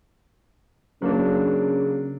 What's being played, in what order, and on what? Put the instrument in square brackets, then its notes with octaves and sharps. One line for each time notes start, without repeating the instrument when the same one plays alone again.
[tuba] C#3 [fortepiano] F#3 A#3 D4